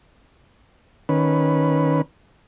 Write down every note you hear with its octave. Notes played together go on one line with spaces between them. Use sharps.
D#3 C#4 B4